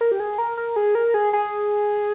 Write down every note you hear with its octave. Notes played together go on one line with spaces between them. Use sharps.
A#4
G4
G#4
A#4
A#4
G#4
A#4
G#4
G#4